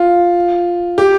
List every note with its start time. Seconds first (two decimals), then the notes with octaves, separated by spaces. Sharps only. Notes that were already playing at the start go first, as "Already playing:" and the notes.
Already playing: F4
0.98 G4